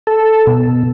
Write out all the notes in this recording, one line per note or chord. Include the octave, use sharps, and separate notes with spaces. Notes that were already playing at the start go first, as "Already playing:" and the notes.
A4
B2